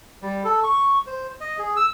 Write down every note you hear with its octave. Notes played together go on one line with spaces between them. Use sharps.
G3
A4
C#6
C5
D#5
G#4
E6